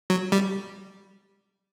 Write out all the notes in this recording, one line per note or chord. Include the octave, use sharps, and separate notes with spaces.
F#3
G3